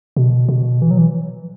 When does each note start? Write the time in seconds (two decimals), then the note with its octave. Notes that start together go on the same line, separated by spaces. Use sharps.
0.17 B2
0.49 B2
0.82 E3
0.91 F#3
0.98 E3